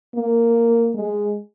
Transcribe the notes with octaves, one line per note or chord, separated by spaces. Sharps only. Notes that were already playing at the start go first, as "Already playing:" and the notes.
A#3
G#3